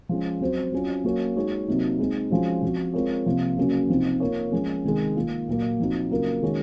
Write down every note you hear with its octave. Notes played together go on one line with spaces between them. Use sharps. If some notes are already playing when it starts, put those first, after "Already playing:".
F3 G#3 C#4
F#3 C4 F#4 C5
F#3 C#4 F4
F#3 A#3 C#4 F#4 C#5
G#3 D#4 F#4 C#5
C3 F#3 A#3 D#4
G#3 C4 D#4
F3 G#3 C#4 F#4 C5
F3 C4 F#4
G#3 C4 F4 A#4 C#5
C3 F3 A#3
C#3 F#3 A#3 C#4
C3 F3 C4 D#4
A#3 F4 A#4 C#5
F3 G#3 C#4
C3 D#3 G#3
D#3 A#3 F4
A#2 F#3 A#3
F3 C4 D#4 F#4
C#3 F#3 A#3 F4 A#4
D#3 G#3 C#4 F#4 C#5